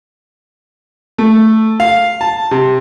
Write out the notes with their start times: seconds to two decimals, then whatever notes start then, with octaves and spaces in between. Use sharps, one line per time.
1.18 A3
1.80 F5
2.21 A5
2.51 C3